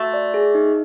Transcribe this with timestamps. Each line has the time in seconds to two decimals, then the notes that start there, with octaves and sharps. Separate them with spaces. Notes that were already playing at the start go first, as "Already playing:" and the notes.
Already playing: A3 F#4
0.14 D5
0.34 G#4
0.55 D#4